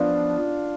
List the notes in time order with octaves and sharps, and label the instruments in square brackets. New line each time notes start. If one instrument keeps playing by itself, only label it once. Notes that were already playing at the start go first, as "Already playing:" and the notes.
Already playing: [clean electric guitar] F3 B3 [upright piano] D4 F4